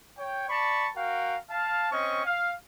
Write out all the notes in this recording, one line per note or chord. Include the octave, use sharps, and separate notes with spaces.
C#5 G5
D5 A5 B5 C#6
F#4 A#4 F5 G5
F5 A5
C4 C#4 D#5 C#6
F5